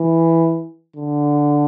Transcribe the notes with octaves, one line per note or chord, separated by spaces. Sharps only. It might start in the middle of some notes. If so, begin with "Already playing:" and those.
Already playing: E3
D3